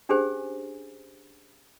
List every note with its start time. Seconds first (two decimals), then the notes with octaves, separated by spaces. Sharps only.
0.09 C#4 D4 G4 G#4 C5 G#5